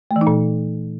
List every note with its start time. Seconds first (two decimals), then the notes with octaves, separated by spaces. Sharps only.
0.11 A3
0.16 E3
0.21 D#4
0.27 A#2